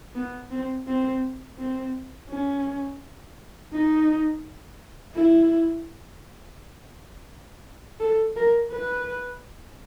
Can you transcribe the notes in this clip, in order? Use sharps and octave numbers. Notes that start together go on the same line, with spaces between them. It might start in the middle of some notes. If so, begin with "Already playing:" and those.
B3
C4
C4
C4
C#4
D#4
E4
A4
A#4
B4